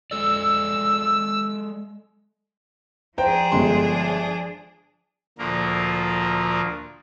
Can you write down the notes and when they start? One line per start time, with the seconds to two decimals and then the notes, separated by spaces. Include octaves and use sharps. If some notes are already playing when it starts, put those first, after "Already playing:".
0.11 G#3 A4 D5 E6
3.18 F3 D4 G#4 C5 G5 A#5
3.52 G1 G#3 C6
5.39 D2 A#2 D3 F3 A#3 A#4